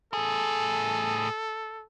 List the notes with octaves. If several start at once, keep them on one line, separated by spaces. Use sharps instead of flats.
A2 G#4 A4